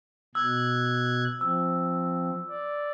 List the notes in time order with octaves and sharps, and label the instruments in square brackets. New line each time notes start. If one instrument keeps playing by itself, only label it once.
[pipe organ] B2 F#6 G#6 [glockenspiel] E6
[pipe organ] F3 C4 [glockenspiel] E6
[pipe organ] D5